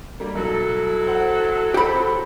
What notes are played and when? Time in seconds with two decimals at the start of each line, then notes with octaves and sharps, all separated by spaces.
0.20 G3 A#3
0.35 B1 F#3 E4 A4
1.07 C5 F#5
1.74 F#4 G4 C5 C#5 B5